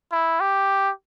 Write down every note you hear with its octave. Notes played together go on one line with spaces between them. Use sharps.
E4
G4